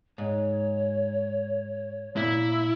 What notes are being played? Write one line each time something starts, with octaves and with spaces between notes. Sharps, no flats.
G#2 C#5
A#2 E4